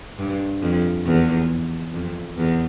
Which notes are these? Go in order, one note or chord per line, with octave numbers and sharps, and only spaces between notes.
G2
F2
E2
F2
E2